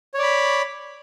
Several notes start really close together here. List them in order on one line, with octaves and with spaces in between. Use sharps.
C#5 D5 B5